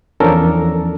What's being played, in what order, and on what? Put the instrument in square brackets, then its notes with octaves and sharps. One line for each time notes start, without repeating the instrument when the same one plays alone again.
[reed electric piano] E2 F3 C#4 D4 A4 A#4